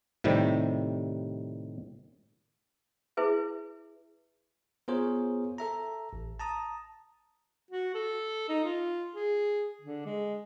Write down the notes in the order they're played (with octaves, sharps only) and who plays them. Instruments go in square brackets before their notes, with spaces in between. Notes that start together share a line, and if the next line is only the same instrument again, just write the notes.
[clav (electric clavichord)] A2 C3 D#3 G3
[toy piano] E4 G#4 B4 E5
[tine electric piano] B3 F4 G#4 A#4 C5 C#5
A4 E5 A#5
A1
A5 A#5 D#6
[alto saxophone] F#4
A4
D#4
F4
G#4
D3
G#3